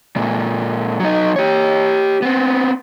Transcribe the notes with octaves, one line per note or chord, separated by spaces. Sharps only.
A#2 G#3
F#3 D#4
G4 C#5
B3 C4